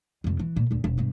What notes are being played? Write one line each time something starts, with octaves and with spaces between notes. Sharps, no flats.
F2 C3
E3
A#2
D2 A#2
E1
G2 B2